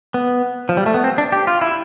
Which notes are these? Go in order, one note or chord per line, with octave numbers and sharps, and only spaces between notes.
B3
F3
G3
A3
B3
C4
D4
G4
F4
E4